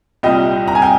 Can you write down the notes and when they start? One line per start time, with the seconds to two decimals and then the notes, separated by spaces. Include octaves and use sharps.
0.23 C2 A#2 G3 D#5 G5
0.68 A#5
0.75 G#5
0.82 G5